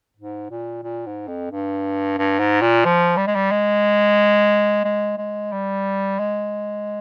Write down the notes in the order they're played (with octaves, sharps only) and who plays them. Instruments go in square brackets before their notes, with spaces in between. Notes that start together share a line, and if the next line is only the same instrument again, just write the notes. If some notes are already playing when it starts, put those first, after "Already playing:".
[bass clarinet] G#2
A#2
A#2
G#2
F2
G2
G2
G#2
A#2
F3
G3
G#3
G3
G#3
G#3
G#3
G3
G#3